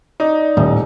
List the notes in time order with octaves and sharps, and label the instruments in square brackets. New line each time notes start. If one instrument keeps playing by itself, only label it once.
[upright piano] D#4 [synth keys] D5
[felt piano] D#1 [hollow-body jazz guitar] A2